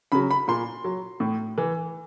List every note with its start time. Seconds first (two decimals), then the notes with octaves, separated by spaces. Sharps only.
0.12 C#3 F#3 B5
0.31 B5
0.48 A#2 C6
0.84 F#3
1.20 A2
1.58 E3